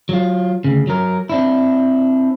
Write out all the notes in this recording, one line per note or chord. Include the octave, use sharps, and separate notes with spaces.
F#3 F4
D2 C#3
F#3 A#4
C4 D4 E4